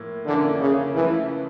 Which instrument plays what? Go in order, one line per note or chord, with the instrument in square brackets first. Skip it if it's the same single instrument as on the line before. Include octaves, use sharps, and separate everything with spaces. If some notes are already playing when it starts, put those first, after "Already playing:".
Already playing: [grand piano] A2 F3 A#3
[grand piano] F2 E3 A#3 C#4 [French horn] D3
[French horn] C#3
[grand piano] C#3 F3 A3 [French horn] E3